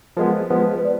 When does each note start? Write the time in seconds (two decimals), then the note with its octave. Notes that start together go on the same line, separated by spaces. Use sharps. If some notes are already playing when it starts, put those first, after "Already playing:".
0.17 F3 G#3 B3 A#4
0.50 F3 G#3 B3 B4
0.78 B4
0.85 D5